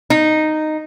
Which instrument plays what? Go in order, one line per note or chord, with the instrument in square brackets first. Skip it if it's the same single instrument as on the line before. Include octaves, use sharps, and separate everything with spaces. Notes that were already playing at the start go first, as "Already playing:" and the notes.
[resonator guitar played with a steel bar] D#4